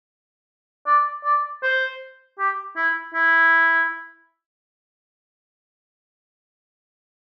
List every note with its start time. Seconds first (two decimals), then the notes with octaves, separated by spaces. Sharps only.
0.87 D5
1.24 D5
1.63 C5
2.39 G4
2.76 E4
3.14 E4